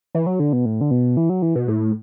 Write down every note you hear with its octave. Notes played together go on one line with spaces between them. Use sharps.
E3
F#3
D3
B2
A2
D3
B2
E3
F#3
E3
B2
A2